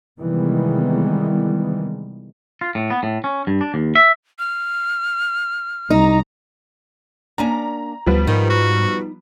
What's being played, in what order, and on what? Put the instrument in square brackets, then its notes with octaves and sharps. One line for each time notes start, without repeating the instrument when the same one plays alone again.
[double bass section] C3 D#3 E3 G3 G#3 B3
[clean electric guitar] F4
A2
B3
A2
C#4
G2
D4
D#2
E5
[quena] F6
[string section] C2 A#5 [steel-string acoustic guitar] D#4
[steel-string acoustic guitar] A#3 C#4 D4 [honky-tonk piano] A#5
[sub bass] D2 [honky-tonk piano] F3 G3 B3
[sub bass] G#2 [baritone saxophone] D#3 [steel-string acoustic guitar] D#4
[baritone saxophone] F#4